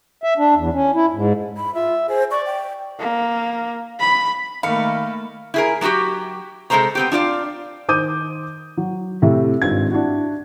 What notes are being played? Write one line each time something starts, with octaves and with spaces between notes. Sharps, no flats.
E5
D4
E2
C#4
E4
G#2
B5
F4 E5
G#4 C5
D5 C#6
G5
A#3
B5
D#3 A3 A#3 F5 B5 F6 C#7
E4 G#4 A#4
F#3 A#3 C4 F#4 G4
C3 G#3 A#3 A4 C5 A#5
B3 C4 G4
D4 F4 D5 F5
D#3 C5 D6 D#6 G6 D#7
F#3
A2 C3 E5
G#1 G2 C4 F4 G#6
D4 E4 F#4